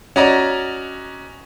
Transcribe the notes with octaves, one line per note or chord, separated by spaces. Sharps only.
C#4 F#4 D5 D#5 A#5